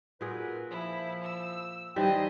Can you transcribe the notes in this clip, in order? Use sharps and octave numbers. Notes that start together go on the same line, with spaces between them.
A#2 F#4 G#4 A#4 B4
F3 E4
E6
D#3 E3 G3 C5 D#5 G5